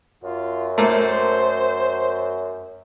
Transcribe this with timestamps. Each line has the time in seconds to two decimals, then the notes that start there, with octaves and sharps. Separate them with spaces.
0.24 F#2 F4
0.78 A3 A#3 C5